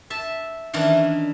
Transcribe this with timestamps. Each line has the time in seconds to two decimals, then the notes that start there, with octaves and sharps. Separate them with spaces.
0.10 E5 A5
0.73 D#3 E3 C#4 D4